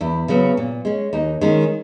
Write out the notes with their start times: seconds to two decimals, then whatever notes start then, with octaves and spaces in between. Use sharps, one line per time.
0.01 E2 E4
0.28 C#3 F#3 B3
0.57 A#2
0.85 G#3 C#4
1.13 D#2 D#4
1.41 D#3 G#3 C#4